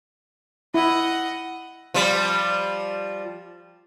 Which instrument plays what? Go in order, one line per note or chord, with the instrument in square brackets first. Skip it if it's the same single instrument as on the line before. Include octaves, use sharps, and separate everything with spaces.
[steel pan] E4 [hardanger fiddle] D#5 F#5
[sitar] F3 G3